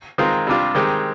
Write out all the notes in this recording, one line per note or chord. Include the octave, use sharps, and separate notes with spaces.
D#3 G#3 C4 F4 A#4
C3 G3 D4 F4
D#3 G#3 C4 G4 A#4